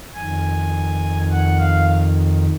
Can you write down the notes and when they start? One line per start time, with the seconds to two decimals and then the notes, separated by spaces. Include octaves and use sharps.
0.15 F2 D#3 G#5
1.31 F#5
1.59 F5